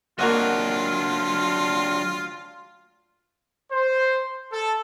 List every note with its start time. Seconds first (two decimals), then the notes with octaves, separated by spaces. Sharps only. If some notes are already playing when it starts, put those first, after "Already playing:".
0.19 F#3 A#3 D4 F4 F#4 D#5
3.72 C5
4.52 A4